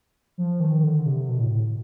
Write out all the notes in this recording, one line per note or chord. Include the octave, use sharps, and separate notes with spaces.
F3
D#3
D3
C3
B2
A2
A2